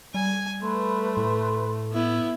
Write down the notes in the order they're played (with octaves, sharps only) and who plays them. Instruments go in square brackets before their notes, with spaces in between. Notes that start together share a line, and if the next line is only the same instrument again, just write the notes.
[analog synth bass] G3 [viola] G#5
[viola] A3 [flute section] B4 B5 C6
[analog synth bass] A2
[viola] B3 E4